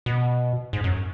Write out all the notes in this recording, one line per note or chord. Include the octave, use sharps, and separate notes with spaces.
B2
G#2
F#2